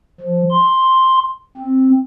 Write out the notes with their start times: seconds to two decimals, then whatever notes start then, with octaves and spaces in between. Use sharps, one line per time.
0.20 F3
0.51 C6
1.57 C4